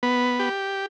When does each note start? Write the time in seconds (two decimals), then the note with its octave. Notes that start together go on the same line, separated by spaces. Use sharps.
0.03 B3
0.39 G4